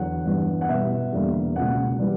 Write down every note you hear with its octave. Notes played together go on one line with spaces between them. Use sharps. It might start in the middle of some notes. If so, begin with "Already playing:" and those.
Already playing: E2 D3 F#3 F#5
G2 E3 B3
F#5
B2 G3 B3 E5
E2 D3 G3 A#3
C#2 B2 A#3 F#5
E3 G3 B3